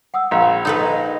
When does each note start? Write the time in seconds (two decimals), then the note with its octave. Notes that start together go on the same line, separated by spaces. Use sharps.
0.14 F#5 D#6 E6
0.31 A#1 E5 F5 C6
0.65 D#4 A4 B4
0.80 D#5